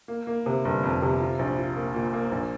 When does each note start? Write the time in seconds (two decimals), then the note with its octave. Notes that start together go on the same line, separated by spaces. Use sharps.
0.08 A#3
0.27 A#3
0.46 C3
0.65 G1
0.83 F2
1.02 C3
1.20 F4
1.39 A#1
1.58 F4
1.75 A#3
1.94 A#2
2.13 A#3
2.31 A#1